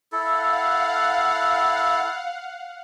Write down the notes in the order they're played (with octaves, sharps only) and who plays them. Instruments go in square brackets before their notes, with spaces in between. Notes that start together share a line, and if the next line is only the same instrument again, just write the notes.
[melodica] E4 A4 [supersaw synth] F5 F#5